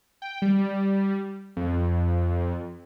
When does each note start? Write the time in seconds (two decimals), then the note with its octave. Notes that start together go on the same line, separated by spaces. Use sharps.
0.22 G5
0.42 G3
1.57 F2